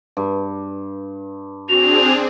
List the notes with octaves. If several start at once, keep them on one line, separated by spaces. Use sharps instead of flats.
G2
C4 D4 F#4 G#4 F7